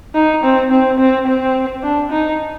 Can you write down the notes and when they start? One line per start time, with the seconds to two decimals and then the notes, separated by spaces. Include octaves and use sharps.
0.15 D#4
0.43 C4
0.71 C4
0.99 C4
1.27 C4
1.83 D4
2.11 D#4